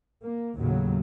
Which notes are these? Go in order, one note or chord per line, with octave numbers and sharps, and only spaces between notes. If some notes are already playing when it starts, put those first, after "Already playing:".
A#3
D#2 A2 C#3 F#3